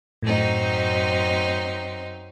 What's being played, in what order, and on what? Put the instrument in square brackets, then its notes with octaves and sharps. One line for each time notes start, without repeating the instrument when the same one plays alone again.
[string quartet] F#2 C4 D#4 [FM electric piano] A2